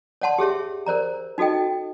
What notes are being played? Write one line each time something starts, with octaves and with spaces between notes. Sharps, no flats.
C#5 D5 F#5 A5 C6
G4 G#4 C#5 E5
A#4 C5 D5 A#5
D#4 F#4 A4 D#5 G5